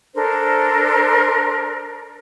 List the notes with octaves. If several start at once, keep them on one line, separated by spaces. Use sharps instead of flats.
D4 A4 A#4 C5